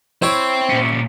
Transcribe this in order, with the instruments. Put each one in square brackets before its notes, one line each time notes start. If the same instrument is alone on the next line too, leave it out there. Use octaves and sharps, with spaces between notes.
[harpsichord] E4 C#5 [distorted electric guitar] C5 G5
[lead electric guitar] A#2 C#4